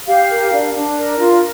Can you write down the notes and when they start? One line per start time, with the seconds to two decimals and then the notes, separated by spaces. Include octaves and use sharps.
0.07 G4 F5
0.30 A#4
0.53 D4
0.75 D4
0.96 A#4
1.19 F4